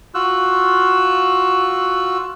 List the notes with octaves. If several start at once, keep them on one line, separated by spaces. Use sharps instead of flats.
F4 F#4 E6 F#6